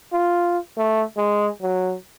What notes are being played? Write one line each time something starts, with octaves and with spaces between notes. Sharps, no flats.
F4
A3
G#3
F#3